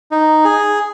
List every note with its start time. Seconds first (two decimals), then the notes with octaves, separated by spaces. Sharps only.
0.11 D#4
0.45 G#4